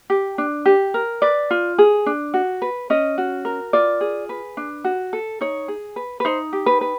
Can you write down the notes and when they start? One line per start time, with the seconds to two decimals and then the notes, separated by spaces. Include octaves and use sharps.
0.10 G4
0.38 D4
0.66 G4
0.94 A#4
1.22 B4 D5
1.51 F4
1.78 G#4
2.06 D4
2.34 F#4
2.62 B4
2.90 C#4 D#5
3.18 F#4
3.45 A#4
3.73 F4 D5
4.01 G#4
4.29 B4
4.57 D4
4.84 F#4
5.13 A4
5.41 D#4 C#5
5.68 G#4
5.96 B4
6.20 B4
6.25 D#4 C5
6.53 G4
6.66 B4
6.81 B4